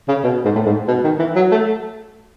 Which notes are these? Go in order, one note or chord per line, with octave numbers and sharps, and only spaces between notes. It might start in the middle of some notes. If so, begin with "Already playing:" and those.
C#3
B2
G#2
A2
G#2
B2
D#3
E3
F#3
A3